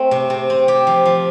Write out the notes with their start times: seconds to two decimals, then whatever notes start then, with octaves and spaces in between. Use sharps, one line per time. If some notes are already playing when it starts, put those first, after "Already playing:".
Already playing: A3 C4
0.11 C3
0.30 C3
0.50 C4
0.68 G4
0.87 F3
1.06 F3